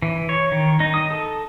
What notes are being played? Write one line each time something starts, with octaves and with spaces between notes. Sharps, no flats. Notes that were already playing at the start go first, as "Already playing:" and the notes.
E3
C#5
D#3
D#4
D#6
A4